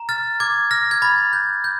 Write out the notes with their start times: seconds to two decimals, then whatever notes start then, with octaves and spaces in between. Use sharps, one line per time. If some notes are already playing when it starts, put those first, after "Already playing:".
Already playing: A#5
0.09 F6 A6
0.40 D6 G#6
0.71 F6 A#6
0.91 G#6
1.02 B5 A6
1.33 G6
1.64 G6